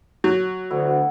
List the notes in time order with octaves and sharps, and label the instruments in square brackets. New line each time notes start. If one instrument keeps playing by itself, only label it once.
[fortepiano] F#3
[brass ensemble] D2 [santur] B3 E4 A4